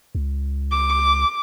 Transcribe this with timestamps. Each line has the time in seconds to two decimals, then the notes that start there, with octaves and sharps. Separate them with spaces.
0.15 C#2
0.71 D6